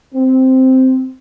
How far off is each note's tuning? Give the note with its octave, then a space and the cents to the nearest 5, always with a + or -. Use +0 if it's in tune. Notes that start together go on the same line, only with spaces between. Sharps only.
C4 -5